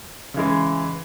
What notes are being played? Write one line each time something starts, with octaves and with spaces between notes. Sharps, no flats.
C#3 E3 G#3